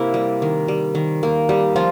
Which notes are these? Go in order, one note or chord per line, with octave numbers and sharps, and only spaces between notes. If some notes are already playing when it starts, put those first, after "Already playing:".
Already playing: C3 A#3 E4
G3
D#3
G3
D#3
A#3
G3
F3 F4